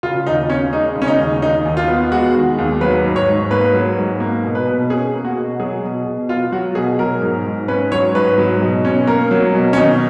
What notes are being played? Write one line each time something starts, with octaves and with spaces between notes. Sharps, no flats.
C#3 F4
D#2 D#4
C#4
G#3 D#4
C#3
C#4
D#4
D#2
D#3 D#4
D#2
F4
B3
G#3 F#4
D#3
D#2
F#3 B4
G#2
C#5
G#2
A#3 B4
F#3
G#2
A#3
B2
B4
B2
C#4 G#4
A#3
F#4
B2
F#3 G#4
B2
B2
B3 F4
F#3 F#4
B2 G#4
F#3 A#4
G#2
G#2
C#4 B4
F#3 C#5
G#2 B4
F#3
B2
C#4
A#3 A#4
F#3
B2
C#4
D#3 D#4